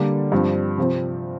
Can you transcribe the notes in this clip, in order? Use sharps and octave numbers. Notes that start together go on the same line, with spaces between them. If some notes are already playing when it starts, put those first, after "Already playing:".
Already playing: D3 G3 A#3 D4
G2 F3 C4
C3 F3 C4